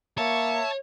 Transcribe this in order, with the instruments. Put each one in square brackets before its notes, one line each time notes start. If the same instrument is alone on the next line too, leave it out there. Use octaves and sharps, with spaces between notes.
[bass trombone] A#3 [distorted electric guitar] C#5 [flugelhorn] E5 [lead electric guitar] A5